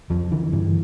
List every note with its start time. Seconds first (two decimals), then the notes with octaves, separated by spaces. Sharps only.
0.10 F2 F3
0.31 D3 E3
0.53 G2 E3